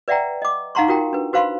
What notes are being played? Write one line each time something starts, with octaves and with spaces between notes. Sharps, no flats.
B4 D5 E5 F#5 G5 A#5
D#5 D6
D#4 F5 F#5 A#5 C6 C#6
F4 F#4 A#4 G5 A#5
D4 B4
F#4 B4 C5 F5 B5 C6